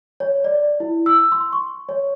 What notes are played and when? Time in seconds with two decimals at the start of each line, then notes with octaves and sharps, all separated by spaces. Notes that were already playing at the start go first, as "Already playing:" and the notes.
0.20 C#5
0.44 D5
0.80 E4
1.06 E6
1.32 C6
1.53 C#6
1.89 C#5